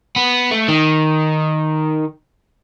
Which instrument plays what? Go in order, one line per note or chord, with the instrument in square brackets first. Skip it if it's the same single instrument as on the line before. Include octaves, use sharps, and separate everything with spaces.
[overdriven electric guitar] B3
A3
D#3